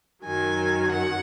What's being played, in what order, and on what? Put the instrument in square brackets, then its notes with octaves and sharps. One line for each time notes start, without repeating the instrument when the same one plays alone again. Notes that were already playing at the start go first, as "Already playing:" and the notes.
[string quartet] F#2 D#3 F#3 G#5
F#5